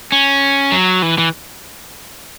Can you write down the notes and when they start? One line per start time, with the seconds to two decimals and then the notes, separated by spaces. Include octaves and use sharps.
0.12 C#4
0.72 F#3
1.02 E3
1.18 E3